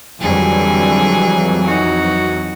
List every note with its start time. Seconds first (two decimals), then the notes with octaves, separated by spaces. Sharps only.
0.21 F2 D3 E3 F#3 G3 G#4
1.65 D#4 F#4